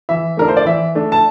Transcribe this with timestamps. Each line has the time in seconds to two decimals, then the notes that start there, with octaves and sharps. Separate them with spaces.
0.09 E3 E5
0.37 A3 D4 A#4
0.48 C5
0.57 D5
0.65 E3 E5
0.95 A3 D4
1.12 A5